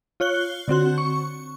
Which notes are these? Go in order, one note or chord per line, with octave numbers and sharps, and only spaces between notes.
F4 C#5 F#6 G7
D3 C4 F#4 F#6
C#6